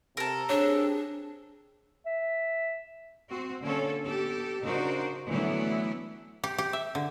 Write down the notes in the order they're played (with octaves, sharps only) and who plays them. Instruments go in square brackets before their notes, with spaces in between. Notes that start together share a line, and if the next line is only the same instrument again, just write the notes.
[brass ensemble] C3 [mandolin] A4 A#4
[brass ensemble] C4 G4 G#4 [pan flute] D4 [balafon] C#5
[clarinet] E5
[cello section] C4 F#4
D3 A#3 C#4 A4 C#5
B3 G4 A4
C#3 D4 D#4 F#4 A#4 C5
D3 E3 F#3 A3 B3 E4
[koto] G4
G4
E5
D3